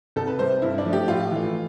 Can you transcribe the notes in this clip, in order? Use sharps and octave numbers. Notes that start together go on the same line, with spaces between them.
C2 A4
B4
C3 G3 C5
G2 E4
D4
F3 A3
G4
A2 F4
E3 A3